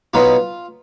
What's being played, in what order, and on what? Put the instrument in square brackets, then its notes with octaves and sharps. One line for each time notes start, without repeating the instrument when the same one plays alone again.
[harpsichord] B2 F#3 B3 D#4 F4